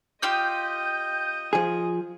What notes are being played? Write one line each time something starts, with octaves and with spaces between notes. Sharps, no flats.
F4 G4 D#5 D#6 E6 G6
F3 G#4